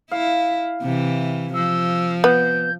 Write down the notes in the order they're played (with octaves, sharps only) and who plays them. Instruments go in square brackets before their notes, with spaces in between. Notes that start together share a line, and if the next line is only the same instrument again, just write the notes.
[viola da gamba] E4 [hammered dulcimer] F5
[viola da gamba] C3 E3
[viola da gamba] F3 [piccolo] E6
[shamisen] B3 [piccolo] G6